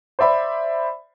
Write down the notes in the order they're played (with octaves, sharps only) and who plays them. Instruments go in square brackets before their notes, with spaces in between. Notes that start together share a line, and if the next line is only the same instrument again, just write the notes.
[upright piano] C5 D5 E5 B5